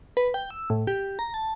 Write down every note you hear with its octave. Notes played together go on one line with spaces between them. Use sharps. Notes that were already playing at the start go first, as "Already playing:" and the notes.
B4
G5
E6
A2
G4
A#5
A5